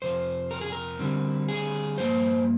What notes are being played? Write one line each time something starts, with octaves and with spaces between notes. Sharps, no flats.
F2 C3 F3 C5
A#4
G#4
A#4
D3 G3 C4
G#4
G2 F3 A#3 C5